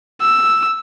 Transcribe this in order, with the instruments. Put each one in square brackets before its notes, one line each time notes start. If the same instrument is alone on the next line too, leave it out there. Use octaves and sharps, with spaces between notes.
[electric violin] E6